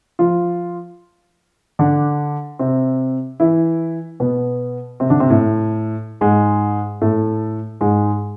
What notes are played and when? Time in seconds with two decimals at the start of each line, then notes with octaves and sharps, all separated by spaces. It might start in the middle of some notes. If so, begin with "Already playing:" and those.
0.19 F3 F4
1.79 D3 D4
2.59 C3 C4
3.40 E3 E4
4.20 B2 B3
5.00 C3 C4
5.10 D3 D4
5.20 C3 C4
5.30 A2 A3
6.21 G#2 G#3
7.02 A2 A3
7.81 G#2 G#3